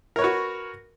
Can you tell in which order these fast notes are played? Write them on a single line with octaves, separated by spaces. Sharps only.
A#4 C#5 B4 F#4